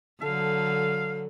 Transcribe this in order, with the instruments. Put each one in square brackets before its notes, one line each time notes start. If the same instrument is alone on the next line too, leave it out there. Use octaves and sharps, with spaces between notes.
[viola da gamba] D3 F#3 [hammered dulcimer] A4 [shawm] F5